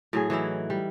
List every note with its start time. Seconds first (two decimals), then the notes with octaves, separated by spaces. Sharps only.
0.13 A2 F#3 G#4
0.30 E3 F#3 D#4 E4
0.70 G3